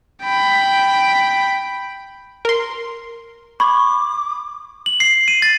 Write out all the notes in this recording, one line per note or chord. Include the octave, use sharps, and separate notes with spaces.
G5 B5
A#4 C6
B5 C#6 D6 G#6
F#7
C7
D#7
A6